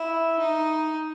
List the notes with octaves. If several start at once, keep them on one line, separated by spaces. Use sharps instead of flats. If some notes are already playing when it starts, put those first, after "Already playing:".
Already playing: E4
D#4